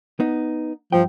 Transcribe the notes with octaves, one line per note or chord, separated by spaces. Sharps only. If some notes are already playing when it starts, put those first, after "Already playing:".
B3 D#4
G2 F3 G5